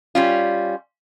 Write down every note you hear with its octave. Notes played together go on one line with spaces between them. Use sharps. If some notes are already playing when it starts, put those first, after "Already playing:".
G3 C#4 F4